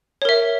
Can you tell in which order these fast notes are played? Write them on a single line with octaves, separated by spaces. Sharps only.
C#5 A#4 E5